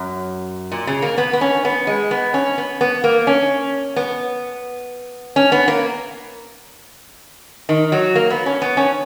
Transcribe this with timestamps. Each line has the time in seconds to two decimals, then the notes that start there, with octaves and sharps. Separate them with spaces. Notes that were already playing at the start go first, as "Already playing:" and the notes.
Already playing: F#2
0.72 A#2
0.87 C#3
1.02 A#3
1.18 B3
1.33 B3
1.41 C#4
1.65 B3
1.87 G#3
2.11 B3
2.34 C#4
2.58 B3
2.81 B3
3.04 A#3
3.27 C#4
3.96 B3
5.36 C#4
5.52 B3
5.68 A#3
7.69 D#3
7.92 F#3
8.15 A#3
8.30 B3
8.46 C#4
8.62 B3
8.77 C#4